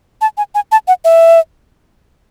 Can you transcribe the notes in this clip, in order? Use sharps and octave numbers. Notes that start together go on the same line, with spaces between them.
A5
G#5
G#5
A5
F#5
E5